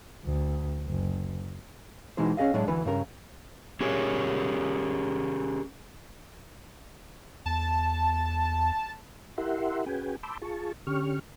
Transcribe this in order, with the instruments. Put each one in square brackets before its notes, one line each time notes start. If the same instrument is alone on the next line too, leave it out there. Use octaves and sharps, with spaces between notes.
[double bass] D2
F#1
[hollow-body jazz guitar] B2 E3 G#3 D#4 C5
C#4 G#4 D#5 F5
A2 F#3 G#3 D4
D2 E3 B4
G2 C#3 A#4
[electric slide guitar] C#4 G4 G#4 A#4 C#5
[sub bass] E2 [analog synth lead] A5
[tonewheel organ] E4 G4 A#4 E5 F#5 C6
C#4 F#4 G#4 B4 G5 G#5
A5 B5 C6 D6 E6 G6
F4 G#4 A5 C#6
D3 C#4 G4 C#6 F6